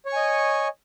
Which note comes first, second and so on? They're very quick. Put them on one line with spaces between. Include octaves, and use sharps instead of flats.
C#5 C#6 G#5 D#5